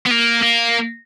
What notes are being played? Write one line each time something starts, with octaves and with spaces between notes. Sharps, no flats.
B3
A#3
A#3